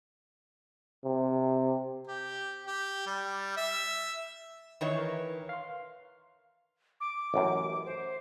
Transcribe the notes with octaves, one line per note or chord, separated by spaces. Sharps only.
C3
G4
G4
G3
E5
D#3 E3 C#5
A#4 B4 A#5
F5 C6
D6
A1 F#2
C5